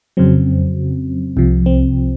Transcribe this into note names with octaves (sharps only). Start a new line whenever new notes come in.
F2 C#3 F#3 C4
C2 C3 F3
C4